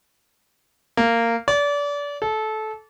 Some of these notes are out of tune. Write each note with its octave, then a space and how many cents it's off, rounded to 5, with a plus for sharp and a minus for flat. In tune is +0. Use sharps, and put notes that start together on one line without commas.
A#3 -15
D5 -30
A4 -20